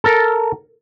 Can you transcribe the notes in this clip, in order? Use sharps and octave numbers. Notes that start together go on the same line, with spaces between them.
A4 A#4